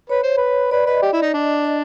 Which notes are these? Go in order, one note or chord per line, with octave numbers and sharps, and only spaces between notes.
B4 C#5
C5
B4
B4 D5
B4 D#5
G4
E4
D#4
D4
D5